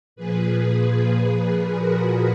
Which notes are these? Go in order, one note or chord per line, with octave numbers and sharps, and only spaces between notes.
A#2 F3 G#4 B4
F#4 A#4